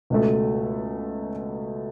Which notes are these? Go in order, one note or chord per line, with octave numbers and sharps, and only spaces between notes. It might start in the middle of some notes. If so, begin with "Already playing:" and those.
C#2 B2 A3